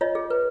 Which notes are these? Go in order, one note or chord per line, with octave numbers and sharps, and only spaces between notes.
F4 C#5 D#5
G#4
B4